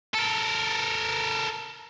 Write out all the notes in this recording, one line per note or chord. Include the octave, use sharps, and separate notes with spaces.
A4 A#4